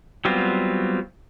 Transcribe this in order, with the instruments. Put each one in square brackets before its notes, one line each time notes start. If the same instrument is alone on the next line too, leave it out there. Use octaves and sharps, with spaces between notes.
[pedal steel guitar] F#3 G3 B3 C4 F4